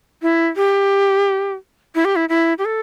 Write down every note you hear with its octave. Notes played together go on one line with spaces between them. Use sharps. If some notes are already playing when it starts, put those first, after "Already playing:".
E4
G4
E4
G4
E4
E4
G4
A4